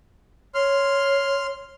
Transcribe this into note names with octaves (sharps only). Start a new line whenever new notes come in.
C#5 C6 F6